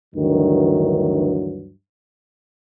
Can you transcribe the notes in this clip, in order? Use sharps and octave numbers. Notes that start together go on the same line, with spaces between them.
D2 G2 D#3 E3 F#3